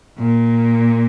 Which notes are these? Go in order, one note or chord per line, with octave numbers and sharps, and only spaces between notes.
A#2